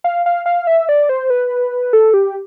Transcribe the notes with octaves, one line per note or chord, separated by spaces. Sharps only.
F5
F5
F5
E5
D5
C5
B4
A4
G4